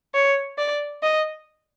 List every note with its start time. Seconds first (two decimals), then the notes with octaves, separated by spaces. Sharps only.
0.14 C#5
0.58 D5
1.03 D#5